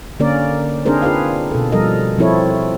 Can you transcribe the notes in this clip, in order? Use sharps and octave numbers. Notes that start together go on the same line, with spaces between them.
D3 A#3 C#4 A#4 D5
C4 D4 D#4 G#4 A#4 C5
F4 G#4 B4 F5
B2 A4
F3 G3 A4 A#4 D#5
F3 C4 E4 A4 C#5